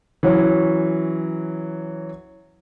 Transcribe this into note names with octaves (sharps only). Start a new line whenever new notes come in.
E3 F#3 C#4